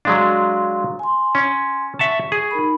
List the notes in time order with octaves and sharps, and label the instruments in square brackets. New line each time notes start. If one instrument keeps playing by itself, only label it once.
[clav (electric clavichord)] F#3 G#3 D4 [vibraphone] F5 C6
[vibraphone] G#5 C6
[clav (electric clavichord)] C#4
[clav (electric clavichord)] E5 F#5 A5 [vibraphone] C#6
[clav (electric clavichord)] G#4
[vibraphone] D#4 A#4 B5